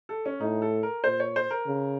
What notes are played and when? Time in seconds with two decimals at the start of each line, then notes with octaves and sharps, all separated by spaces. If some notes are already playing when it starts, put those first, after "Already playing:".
0.09 A4
0.26 C#4
0.41 A2 D#4
0.62 A4
0.83 A#4
1.04 A#2 C5
1.20 C#5
1.36 C5
1.51 A#4
1.67 C#3